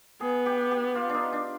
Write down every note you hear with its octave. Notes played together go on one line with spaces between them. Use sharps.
B3 G#4
G4
G4
F4
D4
D#4
D4